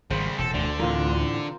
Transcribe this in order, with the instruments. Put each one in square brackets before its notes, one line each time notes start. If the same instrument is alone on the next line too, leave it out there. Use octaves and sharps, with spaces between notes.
[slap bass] G#1 [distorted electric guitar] C#3 G3 [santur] C5
[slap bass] E1 A2 [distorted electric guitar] A4
[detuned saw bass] D2 [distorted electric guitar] D3
[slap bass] A2 E3 [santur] C4 F4 A#4